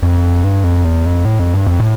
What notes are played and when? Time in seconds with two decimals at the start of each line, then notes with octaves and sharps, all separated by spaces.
0.03 F2
0.44 G2
0.64 F2
0.84 E2
1.06 F2
1.25 A2
1.39 F2
1.54 G2
1.67 F2
1.80 A2